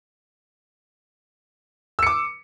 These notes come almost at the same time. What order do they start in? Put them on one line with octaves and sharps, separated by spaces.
E6 C#7 D6